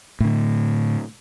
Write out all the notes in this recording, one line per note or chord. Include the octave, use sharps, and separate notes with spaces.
A2 D3